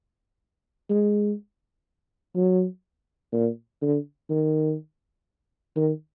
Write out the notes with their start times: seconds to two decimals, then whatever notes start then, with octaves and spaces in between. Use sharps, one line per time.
0.90 G#3
2.35 F#3
3.33 A#2
3.82 D3
4.30 D#3
5.76 D#3